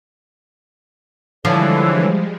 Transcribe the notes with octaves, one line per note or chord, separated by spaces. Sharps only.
D3 E3 F3 G3 G#3 A4 C5 C#5